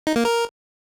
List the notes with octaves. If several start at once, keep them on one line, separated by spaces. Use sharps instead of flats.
D#4
A#3
A#4